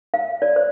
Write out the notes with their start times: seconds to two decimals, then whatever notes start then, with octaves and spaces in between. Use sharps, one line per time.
0.14 F5
0.42 D5
0.56 C5